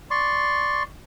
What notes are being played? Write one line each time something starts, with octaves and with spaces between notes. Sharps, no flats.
D5 C6 C#6